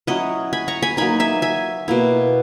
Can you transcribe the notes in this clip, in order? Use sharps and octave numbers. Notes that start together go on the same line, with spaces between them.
F#3 C#4 E4 D#5 F#5
G#5 B5
A#5 C#6
G#5 B5
F#3 A#3 D#4 G#5 B5
E5 G#5
E5 G#5
B2 A#3 E4